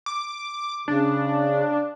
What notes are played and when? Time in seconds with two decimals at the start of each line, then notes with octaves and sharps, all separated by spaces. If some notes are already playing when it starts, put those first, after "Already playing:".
0.06 D6
0.88 C#3 D4